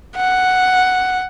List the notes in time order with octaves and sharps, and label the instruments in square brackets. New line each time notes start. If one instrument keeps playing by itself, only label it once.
[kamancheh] F#5